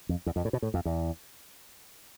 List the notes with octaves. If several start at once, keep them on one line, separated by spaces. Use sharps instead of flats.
F2
E2
F2
A2
B2
A2
F2
E2